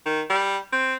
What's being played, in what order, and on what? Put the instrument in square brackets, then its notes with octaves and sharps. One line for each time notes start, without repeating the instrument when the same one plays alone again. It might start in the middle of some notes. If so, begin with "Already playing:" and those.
[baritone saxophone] D#3
G3
C4